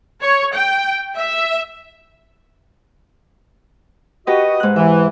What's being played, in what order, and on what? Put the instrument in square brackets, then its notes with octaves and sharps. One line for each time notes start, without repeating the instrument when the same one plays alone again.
[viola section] C#5
G5
E5
[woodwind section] F#4 D#5 [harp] G4 B4
[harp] G#2 F#6
[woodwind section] E3 [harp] E5